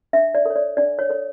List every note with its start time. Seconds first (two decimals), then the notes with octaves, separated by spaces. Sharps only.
0.13 D4 E5
0.35 D5
0.45 A4 C#5
0.56 D5
0.77 D4 D5
0.99 C#5
1.10 A4 C#5